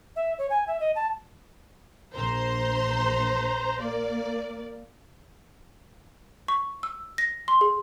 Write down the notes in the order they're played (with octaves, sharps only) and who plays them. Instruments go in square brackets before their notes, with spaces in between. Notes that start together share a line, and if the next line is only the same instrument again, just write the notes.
[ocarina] E5
C#5
G#5
E5
D#5
A5
[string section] A#1 C5 A#5 C6
A#3 D5
[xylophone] C#6
E6
A#6
C6
G#4